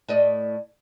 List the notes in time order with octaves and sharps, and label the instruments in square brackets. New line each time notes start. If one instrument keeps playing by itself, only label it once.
[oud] A2 D5 D#5